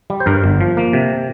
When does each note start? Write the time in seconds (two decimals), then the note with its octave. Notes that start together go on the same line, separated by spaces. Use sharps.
0.10 G3
0.20 C5
0.26 G2 A#4
0.44 G1
0.61 F3
0.77 A#3
0.93 C3